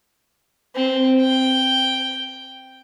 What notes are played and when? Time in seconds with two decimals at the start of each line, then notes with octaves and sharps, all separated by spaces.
0.75 C4
1.21 G5